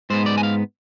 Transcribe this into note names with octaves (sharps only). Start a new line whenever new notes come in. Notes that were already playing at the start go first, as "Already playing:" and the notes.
G#2 G#3 B3 C5
D5
G#5
F5